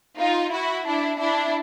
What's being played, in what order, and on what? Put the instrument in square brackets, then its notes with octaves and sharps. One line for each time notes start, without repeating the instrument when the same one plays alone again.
[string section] D#4 F4
E4 F#4
D4 E4
D4 E4